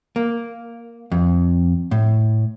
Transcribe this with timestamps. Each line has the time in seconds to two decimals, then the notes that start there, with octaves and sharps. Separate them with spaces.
0.16 A#3
1.12 F2
1.91 A2